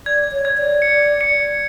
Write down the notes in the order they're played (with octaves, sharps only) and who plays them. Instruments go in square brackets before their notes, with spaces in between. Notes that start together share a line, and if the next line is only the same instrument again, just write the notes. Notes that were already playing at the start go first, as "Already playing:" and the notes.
[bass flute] D5 [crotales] G#6
[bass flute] C#5
[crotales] G#6
[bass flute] D5
[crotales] C#7
C#7